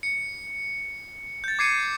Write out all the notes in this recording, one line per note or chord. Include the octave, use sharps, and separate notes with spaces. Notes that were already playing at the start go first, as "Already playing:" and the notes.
C#7
G6 A6
D6 G#6 C7 C#7 D#7